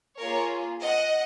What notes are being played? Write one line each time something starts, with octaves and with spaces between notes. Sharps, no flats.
A#3 F4 G#4 A#4 C#5
D#5 F#5